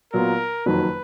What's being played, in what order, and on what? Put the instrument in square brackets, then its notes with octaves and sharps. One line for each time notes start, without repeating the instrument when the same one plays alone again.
[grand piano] A#2 F#3 B3 F4 [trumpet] A#4
[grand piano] F#1 F2 D#3 F#3 [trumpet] B4